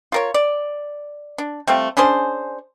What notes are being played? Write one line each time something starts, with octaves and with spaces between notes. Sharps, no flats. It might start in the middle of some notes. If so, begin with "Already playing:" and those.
F4 A#4 C#5
D5
D4
G3 A3 C4 F4
C#4 D4 G#4 C5